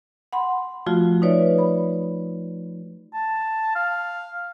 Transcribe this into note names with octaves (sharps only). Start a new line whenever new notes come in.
F#5 B5 C6
F3 A3 F4 F#4
D#4 B4 C#5 D5 E5
B5
A5
F5